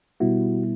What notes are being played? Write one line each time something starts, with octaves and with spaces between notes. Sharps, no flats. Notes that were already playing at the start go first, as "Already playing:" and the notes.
B2 G3 B3 E4 F#4